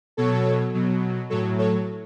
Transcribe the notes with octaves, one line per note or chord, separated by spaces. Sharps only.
B2 F#3 A4 C#5
B2 F#3
A2 F#3 A4 C#5
A4 C#5